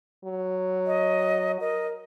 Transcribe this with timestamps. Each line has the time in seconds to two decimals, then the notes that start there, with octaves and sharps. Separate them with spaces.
0.25 F#3
0.87 D#5
1.61 A#4 D#5